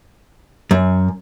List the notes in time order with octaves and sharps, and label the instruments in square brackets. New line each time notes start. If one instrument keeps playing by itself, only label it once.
[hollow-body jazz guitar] F#2